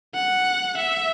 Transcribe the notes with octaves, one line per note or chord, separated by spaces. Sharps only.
F#5
E5